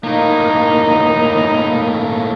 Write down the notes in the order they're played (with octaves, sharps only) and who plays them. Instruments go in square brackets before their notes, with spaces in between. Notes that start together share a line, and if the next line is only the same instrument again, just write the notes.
[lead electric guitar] A2 A#3 [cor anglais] D#4